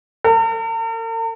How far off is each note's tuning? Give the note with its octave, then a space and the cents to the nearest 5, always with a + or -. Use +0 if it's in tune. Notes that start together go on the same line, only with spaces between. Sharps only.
A#4 -45